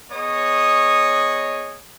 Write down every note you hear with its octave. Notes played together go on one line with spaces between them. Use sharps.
B3 G#4 C#5 D#5 C#6 D#6